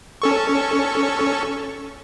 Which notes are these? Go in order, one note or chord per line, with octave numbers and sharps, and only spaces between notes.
C#4 A4 C#6